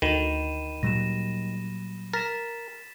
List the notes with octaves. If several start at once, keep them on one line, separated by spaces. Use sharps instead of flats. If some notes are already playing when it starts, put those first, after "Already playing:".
D2 D#3 B5 D#7 E7
A#2 F#3 G3 A#6 E7
A#4 A6 B6 E7